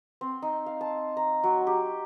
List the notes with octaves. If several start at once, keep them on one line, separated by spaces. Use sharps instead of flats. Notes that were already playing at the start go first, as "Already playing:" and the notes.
C4
D#4
F5
A5
A#5
F#3
G4